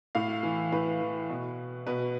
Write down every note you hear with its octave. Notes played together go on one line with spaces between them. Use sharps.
A2 F5
E3
A2 B4
E3
B2
B2 B4